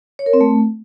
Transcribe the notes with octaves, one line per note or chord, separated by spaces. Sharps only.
C#5
A#4
C4
A3